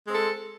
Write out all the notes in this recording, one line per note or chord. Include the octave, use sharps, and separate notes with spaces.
G#3 C4 A4